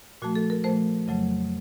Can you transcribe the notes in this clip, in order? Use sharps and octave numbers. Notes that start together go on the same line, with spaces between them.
A#2 F3 A3 F#4
A4
A#4
A#2 F3 A3 C5
F2 C#3 F#3 A3